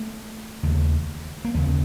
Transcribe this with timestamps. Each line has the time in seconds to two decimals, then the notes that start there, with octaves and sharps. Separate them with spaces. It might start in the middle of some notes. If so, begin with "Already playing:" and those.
Already playing: A3
0.63 D#2 C#3
1.45 A#3
1.54 D#2 C#3 B3